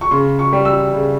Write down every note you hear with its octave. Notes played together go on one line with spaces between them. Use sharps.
C#6
C#3 C6
C#6
G3
E6
C#3